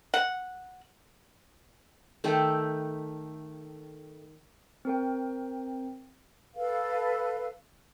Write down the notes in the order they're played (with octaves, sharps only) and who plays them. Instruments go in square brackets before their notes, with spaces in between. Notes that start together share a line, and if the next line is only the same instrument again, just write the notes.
[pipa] F#5
[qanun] D#3 A3 A4 G5
[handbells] C4 A#4 G5
[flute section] A4 B4 F5